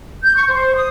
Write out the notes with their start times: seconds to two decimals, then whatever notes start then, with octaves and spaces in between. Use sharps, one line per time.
0.23 G6
0.36 C#6
0.49 C5
0.75 D#6